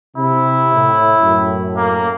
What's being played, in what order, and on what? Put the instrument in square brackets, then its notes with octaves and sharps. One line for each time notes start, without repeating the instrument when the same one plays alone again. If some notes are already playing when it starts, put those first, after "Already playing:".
[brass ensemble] C3 [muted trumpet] E4
[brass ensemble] A2
F#2 A2
[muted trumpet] A#3